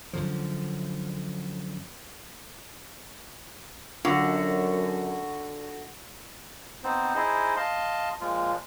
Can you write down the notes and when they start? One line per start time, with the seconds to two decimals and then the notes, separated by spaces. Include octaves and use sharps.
0.13 F#2 D3 F3
4.05 F#2 D3 F#4
6.84 B3 C4 D#4 C5
7.15 D#4 E4 G#4 C5 D#5
7.56 D#5 F5 A5 C6
8.21 A#2 F3 G#3 F4